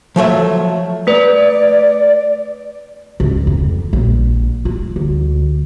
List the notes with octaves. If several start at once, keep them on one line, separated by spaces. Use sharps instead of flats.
F3 F#3 A3 E5
A3 B4 D5
C#2
F2
A#1
F4
D2